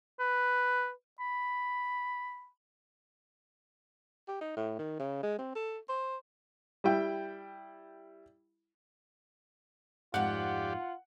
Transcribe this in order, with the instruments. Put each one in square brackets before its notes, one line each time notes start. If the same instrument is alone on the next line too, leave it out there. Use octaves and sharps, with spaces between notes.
[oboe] B4
B5
[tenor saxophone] G4
D#4
A2
D#3
C#3
G#3
C4
A4
C5
[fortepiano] G3 E4 G5
[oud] F2 G#2 F5 [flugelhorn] F4 [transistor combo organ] G4 D5 [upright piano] F#5